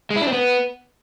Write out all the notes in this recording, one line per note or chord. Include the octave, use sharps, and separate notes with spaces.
G#3
E4
D4
C4
B3